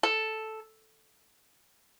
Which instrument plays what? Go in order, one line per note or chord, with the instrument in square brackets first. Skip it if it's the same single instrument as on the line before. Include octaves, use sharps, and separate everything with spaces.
[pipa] A4